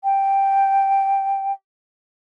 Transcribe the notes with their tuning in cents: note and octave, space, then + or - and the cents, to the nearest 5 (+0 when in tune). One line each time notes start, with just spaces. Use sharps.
G5 +0